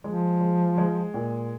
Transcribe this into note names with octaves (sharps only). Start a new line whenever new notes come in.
F3 G#3
G#3
G#3
A#2